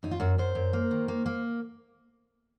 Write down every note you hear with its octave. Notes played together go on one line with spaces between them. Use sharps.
F#2 D#4
F4
F#2 F#4
F#2 C5
F#2
A#3
D#3
A#3
A#3